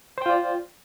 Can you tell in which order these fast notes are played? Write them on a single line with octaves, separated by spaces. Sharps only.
C5 G5 F4 D5